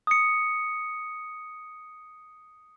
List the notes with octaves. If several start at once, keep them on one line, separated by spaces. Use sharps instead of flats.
D#6 C#7